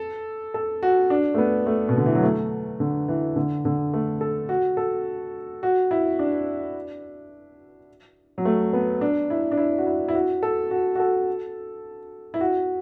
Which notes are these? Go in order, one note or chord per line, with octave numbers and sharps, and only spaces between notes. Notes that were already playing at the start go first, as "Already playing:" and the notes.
Already playing: A4
A4
F#4
D4
A3
B3
A3
B2
D3
E3
F#3
A3
D3
E3
D3
D3
A3
A4
F#4
A4
F#4
E4
D4
F#3
A3
B3
D4
E4
D4
E4
F#4
E4
E4
F#4
A4
F#4
F#4
A4
E4
F#4